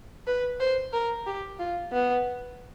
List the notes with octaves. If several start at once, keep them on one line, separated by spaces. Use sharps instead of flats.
B4
C5
A#4
G4
F4
B3